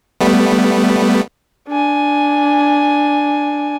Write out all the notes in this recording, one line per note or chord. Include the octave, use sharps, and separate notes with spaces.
G3 A3 B3
D4 G#5